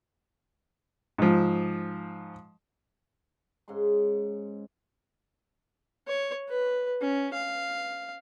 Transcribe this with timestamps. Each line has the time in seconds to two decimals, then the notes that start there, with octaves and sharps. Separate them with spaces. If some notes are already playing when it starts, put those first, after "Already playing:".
1.18 G#2 F3
3.68 G#2 C#3 F#5 C6
6.08 C#5
6.49 B4
7.01 C#4
7.34 F5